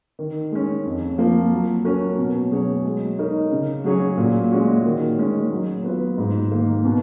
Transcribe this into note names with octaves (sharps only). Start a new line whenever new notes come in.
D#3
G#3 C#4
F2
F3 A#3
F#3
C#4 F#4 A#4
B2
F#3 C#4 G#4 C#5
G#3
D#4 A#4 C#5
C#3
F#3 C#4 G#4 C#5
A#2
G#3 C#4 F#4
D#3
G#3 C#4
F#3
B3 F4 B4
G#2
D#3 A#3
B2